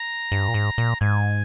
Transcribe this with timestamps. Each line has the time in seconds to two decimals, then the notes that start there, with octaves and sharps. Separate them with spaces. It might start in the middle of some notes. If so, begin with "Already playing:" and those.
Already playing: A#5
0.32 G2
0.48 A#2
0.54 G#2
0.78 A#2
1.01 G#2 G#5